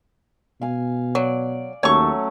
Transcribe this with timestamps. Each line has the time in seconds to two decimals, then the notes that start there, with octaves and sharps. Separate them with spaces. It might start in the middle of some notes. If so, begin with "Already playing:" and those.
0.61 B2 F5 G#5
1.15 F#3 D5
1.83 D#2 F#3 A3 C#4 C#5 C#6